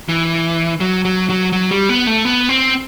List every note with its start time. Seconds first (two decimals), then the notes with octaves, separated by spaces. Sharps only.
0.09 E3
0.80 F#3
1.05 F#3
1.30 F#3
1.52 F#3
1.71 G3
1.89 B3
2.07 A3
2.25 B3
2.49 C4